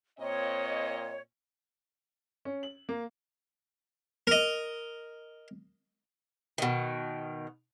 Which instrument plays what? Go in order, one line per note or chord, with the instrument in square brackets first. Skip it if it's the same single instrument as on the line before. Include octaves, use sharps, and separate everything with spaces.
[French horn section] A#2 C4 D#5 [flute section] C#5
[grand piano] C#4
F#7
A#3
[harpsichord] A#4 D#5
[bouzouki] B2 D#3